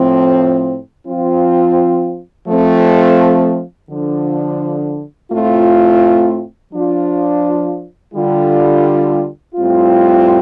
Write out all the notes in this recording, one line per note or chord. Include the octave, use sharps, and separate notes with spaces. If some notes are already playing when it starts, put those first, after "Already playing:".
Already playing: A2 F3 C4
F3 C4 F4
F3 A3 C4
D3 F3 D4
A2 A3 C4 F4
F3 D4 F4
D3 G3 F4
A2 G3 C4 F4